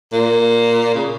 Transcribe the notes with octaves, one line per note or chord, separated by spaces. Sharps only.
A#2
C#3